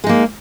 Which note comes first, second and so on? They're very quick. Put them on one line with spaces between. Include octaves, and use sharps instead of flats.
G#3 D#4 A#3